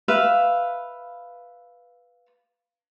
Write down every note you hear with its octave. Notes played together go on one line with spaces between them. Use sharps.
B4 E5 F5